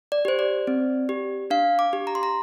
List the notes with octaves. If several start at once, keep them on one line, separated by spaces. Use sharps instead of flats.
D5
G4 C5
D5
C4
G4
D4 F5
D6
G4
A#5
C6
A#5